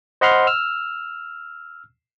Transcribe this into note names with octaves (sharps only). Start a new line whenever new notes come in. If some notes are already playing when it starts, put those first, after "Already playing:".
C5 D#5 F#5 B5 C6 F6
E6 F6